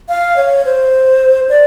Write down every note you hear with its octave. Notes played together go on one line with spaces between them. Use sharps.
F5
C#5
C5
D5